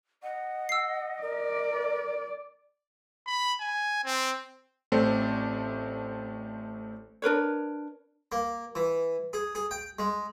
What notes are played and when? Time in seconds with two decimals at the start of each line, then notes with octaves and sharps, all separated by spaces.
0.23 D#5 F#5
0.69 E6 C7
1.22 A#4 D5
3.27 B5
3.61 G#5
4.05 C4
4.92 A1 A3 C4 C5 D5
7.22 D4 A#4 B4 C#5
8.32 A#3
8.75 E3
9.33 G#4
9.55 G#4
9.71 G5
9.99 G#3